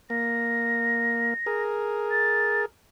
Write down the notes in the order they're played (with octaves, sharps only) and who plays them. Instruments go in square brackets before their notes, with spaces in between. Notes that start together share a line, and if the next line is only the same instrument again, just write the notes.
[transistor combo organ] A#3 [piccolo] A#6
[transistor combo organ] G#4 A#4
[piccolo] A6